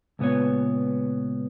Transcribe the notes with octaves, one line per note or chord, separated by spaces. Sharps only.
C#2 A#2 B3 B4 C#5